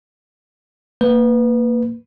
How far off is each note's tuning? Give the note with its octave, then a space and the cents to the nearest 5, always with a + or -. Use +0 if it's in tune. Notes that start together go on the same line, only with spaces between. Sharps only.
A#3 -10 B4 +0